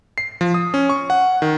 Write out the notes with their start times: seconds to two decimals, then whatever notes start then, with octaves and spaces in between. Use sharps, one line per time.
0.18 C7
0.41 F3
0.54 D#6
0.74 C#4
0.89 C#6
1.10 F#5
1.42 D#3